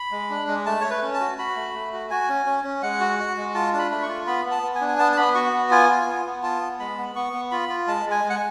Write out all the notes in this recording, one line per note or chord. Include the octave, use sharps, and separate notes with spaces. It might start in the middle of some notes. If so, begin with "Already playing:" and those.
Already playing: B5
G#3
D4
G#3
A3 A5
A3 C#5
B4
C#4
A5
F#4
F#4 B5
A3
A3
F#4
F#4 G#5
C#4
C#4
C#4
G#3 F#5
F#4
F#4
G#3
F4 A5
D4 A5
B5
A3 B5
C#6
F4
B3 B5
B3
A5
B3
G#5
D4
G#5
B3 A5
A5
B3 B5
F#4 C#6
B3
F4 G#5
F4
B3
B3
F4 A5
B3
G#3 B5
B3
B3 C#6
B3
F4 B5
F4
G#3 A5
G#3
G#5
G#3
F#5
G#5